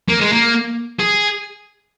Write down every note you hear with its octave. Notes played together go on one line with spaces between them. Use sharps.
A#3
G#3
A#3
G#4